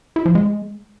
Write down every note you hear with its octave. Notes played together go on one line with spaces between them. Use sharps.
E4
F3
G#3